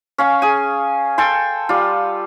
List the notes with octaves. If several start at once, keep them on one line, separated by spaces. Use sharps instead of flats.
C#4 F5 C#6
G#4 G#5
A4 G5 G#5 C6
G3 F4